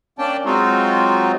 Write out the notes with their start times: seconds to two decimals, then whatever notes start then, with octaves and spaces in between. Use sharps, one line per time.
0.19 A#3 C#4 D4 D5 G5 A5
0.45 F#3 G#3 C4 D#4 F4 F#4